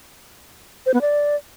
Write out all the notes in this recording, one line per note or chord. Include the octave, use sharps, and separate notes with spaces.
C5
B3
D5